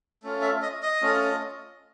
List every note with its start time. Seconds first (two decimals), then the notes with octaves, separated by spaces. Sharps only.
0.23 A3 C#4 F4
0.42 E5
0.62 D#5
0.82 D#5
1.02 A3 C#4 F4